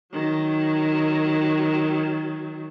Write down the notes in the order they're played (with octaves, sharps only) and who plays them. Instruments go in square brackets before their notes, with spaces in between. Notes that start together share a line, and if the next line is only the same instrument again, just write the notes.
[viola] D#3 F#3